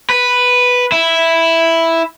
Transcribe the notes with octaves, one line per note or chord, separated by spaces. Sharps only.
B4
E4